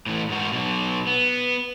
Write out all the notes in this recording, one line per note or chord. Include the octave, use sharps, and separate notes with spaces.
A2 E3
G#2 F#4
B2 F#3
B3